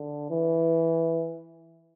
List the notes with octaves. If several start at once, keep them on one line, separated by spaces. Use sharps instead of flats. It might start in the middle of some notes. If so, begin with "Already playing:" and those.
Already playing: D3
E3